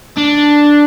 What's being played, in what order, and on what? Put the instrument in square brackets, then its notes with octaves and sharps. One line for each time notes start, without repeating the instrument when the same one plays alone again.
[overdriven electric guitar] D4